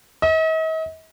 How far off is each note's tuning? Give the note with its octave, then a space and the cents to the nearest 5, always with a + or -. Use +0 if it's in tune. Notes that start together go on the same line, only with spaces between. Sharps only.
D#5 +45